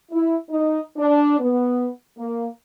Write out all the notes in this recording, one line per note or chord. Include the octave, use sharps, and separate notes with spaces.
E4
D#4
D4
B3
A#3